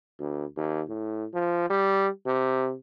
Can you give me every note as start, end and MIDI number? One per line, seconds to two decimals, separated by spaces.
0.19 0.45 38
0.57 0.82 39
0.89 1.25 45
1.34 1.66 53
1.70 2.08 55
2.26 2.74 48